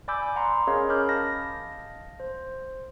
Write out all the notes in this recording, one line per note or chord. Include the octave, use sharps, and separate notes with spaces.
D5 G#5 B5 D6 E6 G6
F#5 A#5 C6
C#4 G#4 A#4 C#5 D#5 F5
C#4 A#4 B5 D6 F6 G6
D#5 F5 A5 A#6
C5